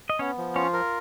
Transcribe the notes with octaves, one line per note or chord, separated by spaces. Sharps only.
D#5
B3 C#4 C#5
F3
C#4 F4 C#5
A#4